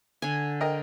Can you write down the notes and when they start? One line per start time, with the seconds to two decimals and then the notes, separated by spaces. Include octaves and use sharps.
0.22 D3 G#5
0.61 A#4 D#5 G5